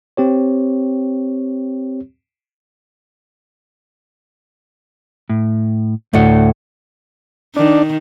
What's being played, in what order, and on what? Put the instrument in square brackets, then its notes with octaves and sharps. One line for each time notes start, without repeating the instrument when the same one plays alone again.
[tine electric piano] C4 G4 C#5
[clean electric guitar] A2
[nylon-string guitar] D2 A2 [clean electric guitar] A3 D5 F#5
[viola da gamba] D#3 [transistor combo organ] D4